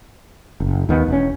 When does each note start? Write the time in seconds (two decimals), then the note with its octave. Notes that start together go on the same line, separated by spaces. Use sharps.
0.60 F#1
0.89 D#2 D#3 B3
1.08 E1 C#4